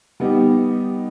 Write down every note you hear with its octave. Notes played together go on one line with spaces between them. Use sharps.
G3 B3 D#4 G4